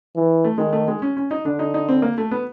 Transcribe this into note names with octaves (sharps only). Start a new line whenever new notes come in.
E3
A3
D#3 G#3
A3
G#3
C#4
C#4
D#4
D3 D4
D#4
D#4
C4
A#3
A3
B3